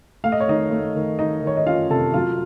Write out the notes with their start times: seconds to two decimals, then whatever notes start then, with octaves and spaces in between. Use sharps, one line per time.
0.24 A3 F5
0.32 D#5
0.40 C#5
0.48 D#3 D#4 D#5
0.71 A3
0.96 D#3
1.19 D#3 D#4 D#5
1.42 D#3 C#5
1.57 D#5
1.67 C#4 F4 F5
1.90 C3 A4 A5
2.14 F#3 F4 F5